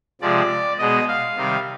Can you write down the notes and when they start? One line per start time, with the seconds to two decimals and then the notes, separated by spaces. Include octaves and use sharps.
0.22 C3 F3 G#3 D5
0.79 B2 G#3 D#5
1.08 F5
1.37 C3 D#3 G3